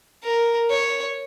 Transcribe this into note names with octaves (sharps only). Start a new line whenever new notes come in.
A#4
C#5